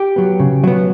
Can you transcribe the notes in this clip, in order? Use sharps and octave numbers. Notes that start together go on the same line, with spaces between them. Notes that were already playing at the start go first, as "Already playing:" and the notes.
Already playing: G4
F#3 B3
C#3
F#3 B3